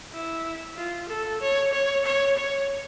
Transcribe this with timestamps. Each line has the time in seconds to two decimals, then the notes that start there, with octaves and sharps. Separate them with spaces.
0.12 E4
0.76 F4
1.09 A4
1.41 C#5
1.73 C#5
2.05 C#5
2.37 C#5